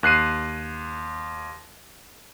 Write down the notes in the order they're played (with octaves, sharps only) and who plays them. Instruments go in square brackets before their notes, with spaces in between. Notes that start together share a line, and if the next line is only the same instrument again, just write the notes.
[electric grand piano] D#2 F#6 C7 D#7